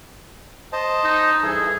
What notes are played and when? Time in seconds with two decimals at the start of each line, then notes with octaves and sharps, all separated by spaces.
0.73 C5 D#5 A5
1.04 D#4
1.43 G2 E3 G#4 A4